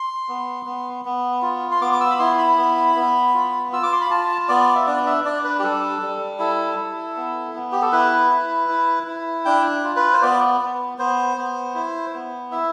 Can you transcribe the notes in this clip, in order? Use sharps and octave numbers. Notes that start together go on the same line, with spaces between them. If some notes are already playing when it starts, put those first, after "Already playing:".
Already playing: C6
B3
B3
B3
F4
C6
B3 D6
D6
E6
B5
E4 C6
B5
B3
B3
F4
F4 E6
D6
C6
B5
F4 A5
B3 D5
E5
D4 D5
E5
D4 D5
B4
G4
G3 A4
G3
E4 A4
E4
B3
B3
G4
A4
E4 B4
E4
E4
E4
D4 G5
F4
B4
C5
B3 D5
B3
B3 C5
B3
E4
B3
E4 E5